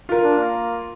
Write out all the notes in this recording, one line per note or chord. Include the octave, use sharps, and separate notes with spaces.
F4 A#4
D4
A#3